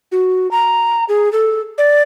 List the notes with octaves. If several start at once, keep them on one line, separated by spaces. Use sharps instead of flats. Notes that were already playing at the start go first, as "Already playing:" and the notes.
F#4
A#5
G#4
A4
D5